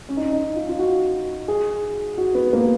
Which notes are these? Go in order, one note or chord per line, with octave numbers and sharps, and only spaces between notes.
C#4
D#4
C#4
D#4
F4
F4
F#4
G#4
F#4
B3
A#3